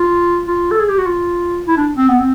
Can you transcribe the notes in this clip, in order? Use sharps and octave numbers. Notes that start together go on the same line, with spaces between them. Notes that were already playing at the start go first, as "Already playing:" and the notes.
Already playing: F4
F4
A4
G#4
G4
F#4
F4
E4
D4
C4
B3
C4